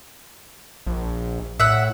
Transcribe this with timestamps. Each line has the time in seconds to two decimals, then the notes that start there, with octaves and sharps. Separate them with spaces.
0.87 A#1
1.60 A2 E5 F#5